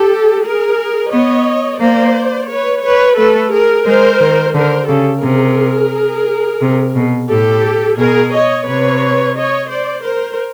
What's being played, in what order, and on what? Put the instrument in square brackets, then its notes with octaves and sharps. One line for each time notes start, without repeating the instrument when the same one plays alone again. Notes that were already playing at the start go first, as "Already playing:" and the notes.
Already playing: [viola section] G4 A4
G#4 A#4
[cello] B3 [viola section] C#5 D#5
[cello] A#3 [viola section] C5 D5
[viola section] B4 C#5
B4 C#5
[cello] A3 [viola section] A4 B4
[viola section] G#4 A#4
[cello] G#3 [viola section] A#4 C5
[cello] D#3
[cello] D3 [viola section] A#4 C5
[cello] C#3 [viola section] G4 A4
[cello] C3 [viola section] G#4 A#4
[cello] C3
B2
[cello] A2 [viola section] G4 A4
[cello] B2 [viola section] G#4 A#4
[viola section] C#5 D#5
[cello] C3 [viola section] B4 C#5
[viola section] C#5 D#5
C5 D5
A#4 C5